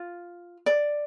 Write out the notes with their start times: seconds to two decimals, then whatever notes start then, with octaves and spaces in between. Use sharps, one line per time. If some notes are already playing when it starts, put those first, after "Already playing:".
Already playing: F4
0.66 D5